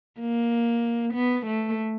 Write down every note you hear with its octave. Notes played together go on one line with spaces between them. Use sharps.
A#3
B3
A3